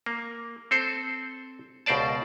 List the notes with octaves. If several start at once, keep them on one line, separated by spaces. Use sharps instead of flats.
A#3
C4 A4 C5
C#2 B2 A#4 C5 D5 A5